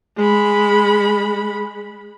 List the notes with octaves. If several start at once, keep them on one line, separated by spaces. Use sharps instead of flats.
G#3 B5